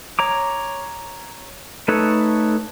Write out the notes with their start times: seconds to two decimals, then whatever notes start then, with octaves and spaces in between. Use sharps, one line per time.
0.19 C#5 A#5 D6
1.88 A3 D#4 A4 B4 C#5